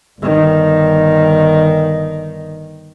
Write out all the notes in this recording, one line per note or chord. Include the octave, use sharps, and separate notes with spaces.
G1 D#3